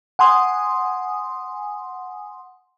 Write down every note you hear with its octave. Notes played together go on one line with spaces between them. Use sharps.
F#5 G#5 C6 D#6